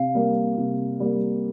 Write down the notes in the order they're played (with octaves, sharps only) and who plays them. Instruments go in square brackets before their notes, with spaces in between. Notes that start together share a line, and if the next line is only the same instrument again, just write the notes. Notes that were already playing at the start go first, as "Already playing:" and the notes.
Already playing: [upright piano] C3 [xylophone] F5
[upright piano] G3 A#3
C3
G3 A#3